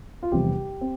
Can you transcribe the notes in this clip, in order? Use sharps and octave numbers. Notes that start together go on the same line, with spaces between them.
F4
F1 E2 C3 G3 C4 G4
C4